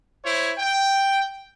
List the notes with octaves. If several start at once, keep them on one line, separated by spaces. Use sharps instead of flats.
E4 C5 C#5
G5